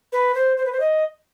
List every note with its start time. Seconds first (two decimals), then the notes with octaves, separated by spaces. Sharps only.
0.12 B4
0.35 C5
0.57 C5
0.66 B4
0.72 C5
0.80 D#5